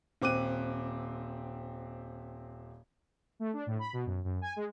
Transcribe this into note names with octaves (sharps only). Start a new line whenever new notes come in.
D#1 C4 D6 F#6 D#7
A3
D4
A2
B5
B2
F#2
F#2
G#5
G#3